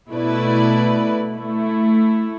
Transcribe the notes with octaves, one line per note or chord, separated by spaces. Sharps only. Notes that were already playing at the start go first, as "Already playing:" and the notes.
B2 A3 E4 B4 D5
A3 E4